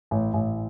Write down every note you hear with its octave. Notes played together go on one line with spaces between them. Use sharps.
A1
A1